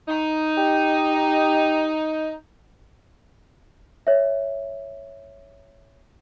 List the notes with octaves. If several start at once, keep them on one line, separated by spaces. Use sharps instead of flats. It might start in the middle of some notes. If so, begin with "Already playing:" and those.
D#4
G4
C#5 E5